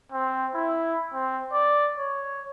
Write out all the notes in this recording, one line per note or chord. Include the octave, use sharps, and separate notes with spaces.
C4
E4
C4
D5
C#5